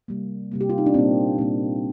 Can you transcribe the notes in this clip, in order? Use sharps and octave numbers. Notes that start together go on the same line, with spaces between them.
C3 G3 A#3
C3 G3 A#3
G4
F4
D#4
D4
A#2 G3 A#3 C4
A#2 G3 A#3 C4